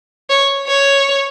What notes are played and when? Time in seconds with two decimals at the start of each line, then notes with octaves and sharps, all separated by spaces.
0.30 C#5
0.68 C#5